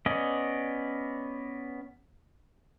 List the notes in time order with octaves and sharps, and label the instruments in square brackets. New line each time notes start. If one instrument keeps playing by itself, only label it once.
[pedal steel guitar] B3 C#4 D5 D#5